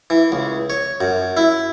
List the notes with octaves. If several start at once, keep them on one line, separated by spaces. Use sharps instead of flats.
E3
C#2
C#5
F#2
E4